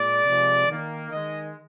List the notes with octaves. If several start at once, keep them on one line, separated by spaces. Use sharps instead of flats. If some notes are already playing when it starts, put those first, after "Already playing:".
Already playing: A#2 G#3 D5
C3 F3 G#3
D#3 A#3
D#3 G#3 D#5